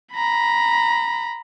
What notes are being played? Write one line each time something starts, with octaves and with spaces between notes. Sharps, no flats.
A#5 B5